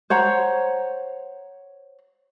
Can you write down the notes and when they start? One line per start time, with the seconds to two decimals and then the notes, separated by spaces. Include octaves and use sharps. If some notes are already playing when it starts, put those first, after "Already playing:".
0.10 C5 C#5 F#5 A#5